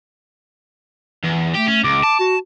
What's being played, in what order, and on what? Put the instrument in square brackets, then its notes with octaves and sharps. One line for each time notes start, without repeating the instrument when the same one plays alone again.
[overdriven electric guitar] E2
[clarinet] A3 [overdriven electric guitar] G4
[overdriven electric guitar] C#4
[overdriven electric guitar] C#2 [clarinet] D6
[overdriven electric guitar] A5
[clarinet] F#4